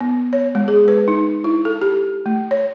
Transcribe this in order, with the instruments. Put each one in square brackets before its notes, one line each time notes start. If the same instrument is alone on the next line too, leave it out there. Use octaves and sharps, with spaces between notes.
[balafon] B3
C#5
G#3
G#4
B4
D#4
E4
A4
G4
A3
C#5